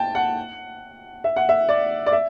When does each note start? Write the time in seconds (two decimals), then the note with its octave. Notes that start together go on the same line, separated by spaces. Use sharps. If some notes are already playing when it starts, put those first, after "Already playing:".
Already playing: G5 A5
0.15 F#5
1.24 E5
1.36 F#5
1.49 E5
1.69 D5
2.06 D5
2.12 E5